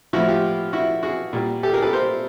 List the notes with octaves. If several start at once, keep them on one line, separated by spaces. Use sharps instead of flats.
A2 F3 E4 F#4
F4 G4
E4 F#4
F#4 G#4
A#2 G3
G4 A4
G#4 A#4
A4 B4
A#4 C5